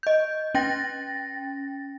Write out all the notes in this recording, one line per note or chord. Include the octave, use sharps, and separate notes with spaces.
D#5 G6
C#4 G5 A6 A#6